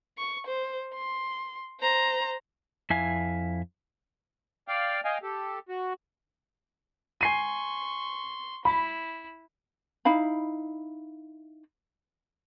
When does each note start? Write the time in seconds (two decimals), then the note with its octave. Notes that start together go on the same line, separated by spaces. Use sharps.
0.18 C#6
0.47 C5
0.94 C6
1.80 C5 A#5
2.90 F2 E4 E5 F5 G#5
4.68 D5 F5 G5
5.05 D#5 F5 G5 G#5
5.23 G4 A4
5.69 F#4
7.21 G#5 C6 C#6 C7 D#7
8.65 E4 B5
10.05 D#4 E4 F5 B5